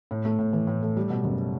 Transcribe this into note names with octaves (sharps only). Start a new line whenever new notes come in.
A2
A3
A2
E3
A2
A3
G3
B2
F#1